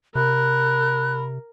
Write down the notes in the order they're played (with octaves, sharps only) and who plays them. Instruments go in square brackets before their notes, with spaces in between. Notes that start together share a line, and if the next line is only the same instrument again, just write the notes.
[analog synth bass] C3 [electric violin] A#4 [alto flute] B5 [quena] F#6